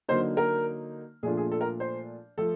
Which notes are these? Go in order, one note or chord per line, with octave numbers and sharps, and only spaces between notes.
D3 F#3 A#3 D#4 C5
A#4
A#2 F3 A3 D4 F4 G#4
G#4
A4
A#4
C5
F3 A3 A4